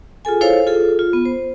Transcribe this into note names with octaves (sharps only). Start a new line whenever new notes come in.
F4 G#4 A4 G#5
E4 A4 C5 C#5 F5
F4 G#4 A4
F4
B3
C5